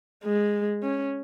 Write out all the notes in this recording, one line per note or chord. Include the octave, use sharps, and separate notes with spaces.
G#3
C#4